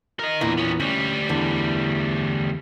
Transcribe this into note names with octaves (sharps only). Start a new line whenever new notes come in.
A#4 D#5
E2 A#2 E3 D4 A#4
B3 C#4
D2 G3 C#4
E2 D3 E3